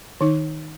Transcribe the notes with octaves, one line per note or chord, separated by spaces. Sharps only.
D#3 D#4